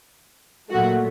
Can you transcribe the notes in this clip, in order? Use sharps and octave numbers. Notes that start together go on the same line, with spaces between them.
A#2 F#3 A3 F#4